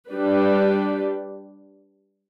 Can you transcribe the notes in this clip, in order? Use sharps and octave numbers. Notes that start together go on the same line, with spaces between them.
G3 D4 G4 B4